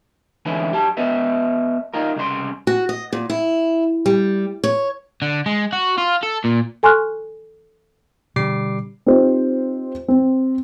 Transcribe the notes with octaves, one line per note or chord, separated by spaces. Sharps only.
D3 E3 G#3 C#4 E4
F#2 G4 A5
B3 B4 D#5 E5
D#4 F4 A#4
C2 C#3 C5 C6
F#4
D#5
A#2
E4
G3
C#5
D3
G#3
F#4
F4
A4
A#2
A4 G#5 C6 C#6 F6 F#6
B2 D3 G3 D6 C7
C4 D#4 F4 G4 C5
C4